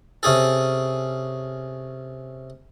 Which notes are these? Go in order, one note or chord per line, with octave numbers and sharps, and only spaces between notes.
C3 C#4 G#4 A4